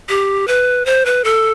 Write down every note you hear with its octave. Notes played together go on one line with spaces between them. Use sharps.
G4
B4
C5
B4
A4